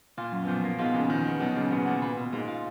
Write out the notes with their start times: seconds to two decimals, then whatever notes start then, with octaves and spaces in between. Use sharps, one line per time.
0.17 A#2 F4
0.32 F#2
0.44 B2
0.47 A#2 F3
0.64 A#3
0.78 G#2 B2 F4
0.94 F2 A#2 C#3
1.10 B2 D#3 F3
1.25 B3
1.40 B2 D#3 F#3
1.55 A#2 C#3 F#3
1.71 G#2 B2 B3
1.86 A#2 F#4
2.02 A#2 B4
2.17 B2
2.33 G#2 A#3
2.48 F4